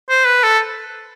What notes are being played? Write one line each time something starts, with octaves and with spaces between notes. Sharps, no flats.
C5
B4
A4